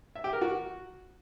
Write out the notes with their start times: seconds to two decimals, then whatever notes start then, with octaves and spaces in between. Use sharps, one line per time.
0.15 E5
0.24 G4
0.33 A#4
0.41 F#4